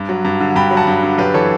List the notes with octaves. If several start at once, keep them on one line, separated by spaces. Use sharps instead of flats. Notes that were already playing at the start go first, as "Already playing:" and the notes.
Already playing: G2
F#3
G2
D3
G2 G5 B5
F#3
F#5 A5
G2
D3
F#2 G4 B4
E3 A4 C#5